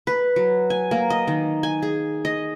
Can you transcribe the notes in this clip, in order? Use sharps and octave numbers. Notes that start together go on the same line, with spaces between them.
B4
F#3
G#5
A#3
D#5
D#3
G#5
G#4
D#5